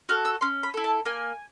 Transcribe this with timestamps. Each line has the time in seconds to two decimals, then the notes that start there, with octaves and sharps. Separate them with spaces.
0.09 F#4 A4 F6
0.25 E6
0.41 C#4 C6
0.63 B5
0.74 E4 A4
0.84 A5
1.05 A#3 G#5